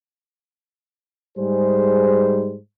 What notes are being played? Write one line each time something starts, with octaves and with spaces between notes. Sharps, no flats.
G#2 G3 G#4 C5